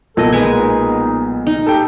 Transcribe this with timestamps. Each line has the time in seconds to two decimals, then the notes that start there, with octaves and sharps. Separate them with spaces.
0.17 B1 A#2 A4 D#5
0.32 G#3 D#4 B4 G#5
1.47 D#4
1.67 G4 A4 G5